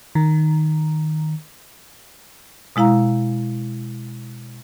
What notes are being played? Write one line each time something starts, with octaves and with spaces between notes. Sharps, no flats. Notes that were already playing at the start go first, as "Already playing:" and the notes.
D#3
B2 G#3 E4 F5 A#5